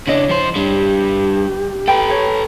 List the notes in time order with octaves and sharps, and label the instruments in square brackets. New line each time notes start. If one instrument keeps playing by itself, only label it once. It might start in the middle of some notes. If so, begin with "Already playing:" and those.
[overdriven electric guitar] C#3 D4 [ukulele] E4 D#5 [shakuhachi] C#5
[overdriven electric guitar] F3 C5
[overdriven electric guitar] G3 D4 [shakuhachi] G4
[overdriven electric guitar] A4 B4 [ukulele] G5
[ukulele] C#5